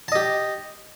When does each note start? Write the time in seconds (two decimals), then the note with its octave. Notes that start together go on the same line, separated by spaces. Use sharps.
0.08 A5
0.12 D#5
0.15 G4